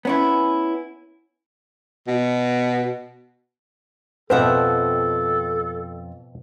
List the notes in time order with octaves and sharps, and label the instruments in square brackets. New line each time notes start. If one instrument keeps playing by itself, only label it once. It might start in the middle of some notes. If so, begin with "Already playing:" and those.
[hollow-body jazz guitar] B3 C#4 E4
[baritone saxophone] B2
[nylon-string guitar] F2 E5 F#5 [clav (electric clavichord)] B2 F3 C4 [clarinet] A4 [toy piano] B4